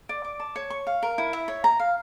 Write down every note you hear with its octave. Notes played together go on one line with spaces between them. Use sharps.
D5
D6
A5
C#5
C#6
F5
A#4
E4
E5
C#5
A#5
F5